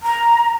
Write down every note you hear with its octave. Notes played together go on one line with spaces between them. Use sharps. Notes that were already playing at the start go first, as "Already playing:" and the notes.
A#5